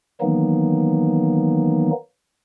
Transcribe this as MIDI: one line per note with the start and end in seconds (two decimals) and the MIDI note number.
0.21 1.91 51
0.21 1.91 52
0.21 1.91 54
0.21 1.91 58
0.21 1.91 59
0.21 1.91 63